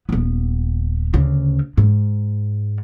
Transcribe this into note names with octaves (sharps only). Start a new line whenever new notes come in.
D#1 B3
D2 C#3
G#2